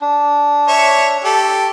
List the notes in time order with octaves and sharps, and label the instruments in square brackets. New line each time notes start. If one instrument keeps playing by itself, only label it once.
[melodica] D4
[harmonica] C#5 E5 C#6
G4 A4